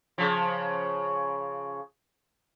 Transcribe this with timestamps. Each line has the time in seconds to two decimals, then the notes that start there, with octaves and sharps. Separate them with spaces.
0.18 C#3 F3